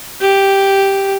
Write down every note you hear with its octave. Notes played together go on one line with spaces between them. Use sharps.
G4